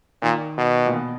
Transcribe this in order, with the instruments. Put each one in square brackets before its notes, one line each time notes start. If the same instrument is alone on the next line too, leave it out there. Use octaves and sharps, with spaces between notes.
[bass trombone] A#2 [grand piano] D#3
[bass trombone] B2
[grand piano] A#2
B2